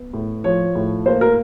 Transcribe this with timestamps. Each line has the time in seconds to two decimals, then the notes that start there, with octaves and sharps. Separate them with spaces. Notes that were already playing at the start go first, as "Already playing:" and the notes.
Already playing: B3
0.13 A2
0.44 F3 C#5
0.75 A2
1.06 A#3 C5
1.21 A#4